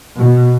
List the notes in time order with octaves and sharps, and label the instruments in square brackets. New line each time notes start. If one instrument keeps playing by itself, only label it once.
[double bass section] B2